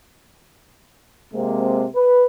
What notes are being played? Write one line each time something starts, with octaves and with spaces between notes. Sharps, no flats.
C3 G#3 A#3 C4
B4